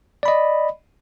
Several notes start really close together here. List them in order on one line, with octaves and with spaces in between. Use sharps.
D5 B5 D#5